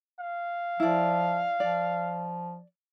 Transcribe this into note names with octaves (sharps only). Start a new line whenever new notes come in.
F5
F3 E4 D5
F3 D5